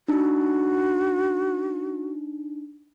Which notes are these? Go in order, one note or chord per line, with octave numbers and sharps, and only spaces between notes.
D4 D#4 F#4